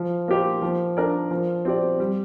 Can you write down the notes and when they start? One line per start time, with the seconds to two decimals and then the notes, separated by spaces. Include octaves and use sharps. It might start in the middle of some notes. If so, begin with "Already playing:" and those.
Already playing: F3
0.28 A#3 G4 C5
0.62 F3
0.97 D4 A#4 D5
1.31 F3
1.65 C4 G4 D5
2.00 G3